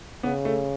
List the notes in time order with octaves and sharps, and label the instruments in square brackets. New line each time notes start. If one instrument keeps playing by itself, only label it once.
[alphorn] C#3 [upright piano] B3
[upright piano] A3